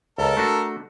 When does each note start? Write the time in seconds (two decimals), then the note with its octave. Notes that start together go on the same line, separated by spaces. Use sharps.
0.18 C#2 A4 A#4
0.37 A3 D4 F#4